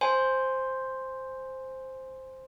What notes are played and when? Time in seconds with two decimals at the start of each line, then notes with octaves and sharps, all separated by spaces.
0.01 C5 G#5 C6